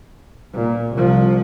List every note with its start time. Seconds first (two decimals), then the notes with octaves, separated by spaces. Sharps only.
0.54 A#2
0.93 C2 F3